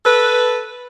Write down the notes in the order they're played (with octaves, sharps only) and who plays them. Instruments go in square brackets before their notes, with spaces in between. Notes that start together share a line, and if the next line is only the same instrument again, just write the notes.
[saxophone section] A4 B4